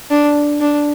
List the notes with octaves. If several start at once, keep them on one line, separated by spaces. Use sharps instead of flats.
D4
D4